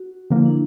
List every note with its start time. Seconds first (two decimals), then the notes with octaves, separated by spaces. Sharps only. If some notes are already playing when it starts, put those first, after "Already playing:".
Already playing: F#4
0.30 D3 F3 A#3 E4
0.46 D4